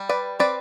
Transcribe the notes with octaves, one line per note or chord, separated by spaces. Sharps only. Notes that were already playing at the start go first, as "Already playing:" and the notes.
Already playing: G3
B4 D5
C4 B4 D5